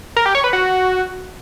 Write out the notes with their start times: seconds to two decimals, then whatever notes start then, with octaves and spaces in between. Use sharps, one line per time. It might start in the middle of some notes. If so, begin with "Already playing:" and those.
0.16 A#4
0.26 G4
0.35 C#5
0.44 B4
0.53 F#4